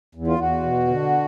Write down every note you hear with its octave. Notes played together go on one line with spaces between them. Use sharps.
E2
F4
E2 F#4
B2
D3